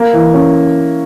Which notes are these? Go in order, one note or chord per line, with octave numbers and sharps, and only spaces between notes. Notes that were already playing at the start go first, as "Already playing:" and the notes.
Already playing: A#3
E3
C#4